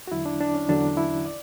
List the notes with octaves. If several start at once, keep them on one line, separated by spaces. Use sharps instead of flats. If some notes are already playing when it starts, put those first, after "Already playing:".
F#4
E2 D3 F#3 E4
D4
D4
C#4
E2 D3 F#3 D4
E4
D5